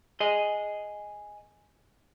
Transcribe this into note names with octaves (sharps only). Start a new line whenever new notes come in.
G#4 D#5